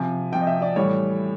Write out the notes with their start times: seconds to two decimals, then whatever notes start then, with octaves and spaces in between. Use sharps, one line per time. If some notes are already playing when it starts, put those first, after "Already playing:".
Already playing: C3 F3 G#5
0.32 C3 F3 G5
0.42 D#5
0.47 E5
0.62 D5
0.76 A2 E3 G3 C#5